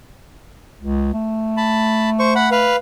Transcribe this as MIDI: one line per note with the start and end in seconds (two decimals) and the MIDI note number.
0.80 1.10 37
1.13 2.79 57
1.57 2.10 81
1.57 2.10 83
2.19 2.34 72
2.19 2.34 85
2.35 2.49 78
2.35 2.49 83
2.51 2.76 71
2.51 2.76 77